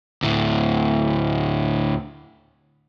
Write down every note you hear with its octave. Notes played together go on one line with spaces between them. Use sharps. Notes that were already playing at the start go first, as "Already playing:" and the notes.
D2 A2